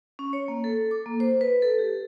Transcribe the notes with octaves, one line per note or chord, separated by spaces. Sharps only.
C#4
C#5
A#3
A4
D6
A#3
C5
B4
A4
G4